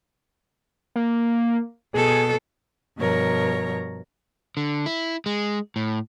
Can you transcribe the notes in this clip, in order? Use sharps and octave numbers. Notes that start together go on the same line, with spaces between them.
A#3
B2 G#4 A4
G2 B2 F3 A#4 C#5 A#5
D3
E4
G#3
A2